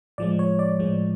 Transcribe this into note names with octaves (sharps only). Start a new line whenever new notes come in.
A2 F3 G#3 D5
C#5
D5
A2 F3 G#3